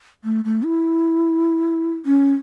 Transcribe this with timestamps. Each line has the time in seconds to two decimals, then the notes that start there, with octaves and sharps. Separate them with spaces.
0.24 A3
0.45 A3
0.65 E4
2.06 C#4